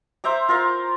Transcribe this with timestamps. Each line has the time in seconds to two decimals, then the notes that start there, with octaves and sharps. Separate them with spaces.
0.24 C5 E5 A#5 D6
0.49 F4 A#4 F5